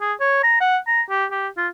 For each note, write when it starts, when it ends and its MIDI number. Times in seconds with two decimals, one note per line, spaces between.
0.01 0.13 68
0.21 0.43 73
0.44 0.57 82
0.61 0.78 78
0.87 1.02 82
1.10 1.25 67
1.32 1.48 67
1.57 1.68 65